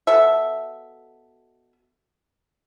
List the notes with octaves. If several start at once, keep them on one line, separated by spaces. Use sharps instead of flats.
B2 A4 E5